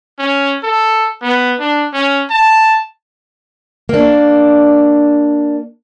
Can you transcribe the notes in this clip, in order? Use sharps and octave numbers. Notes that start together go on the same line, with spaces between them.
C#4
A4
B3
D4
C#4
A5
A#3 D4